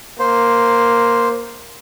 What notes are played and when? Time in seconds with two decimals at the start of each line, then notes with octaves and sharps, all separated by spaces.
0.19 A#3 C5